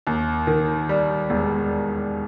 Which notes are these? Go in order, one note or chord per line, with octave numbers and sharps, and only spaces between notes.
D#2
D#3
G3
E1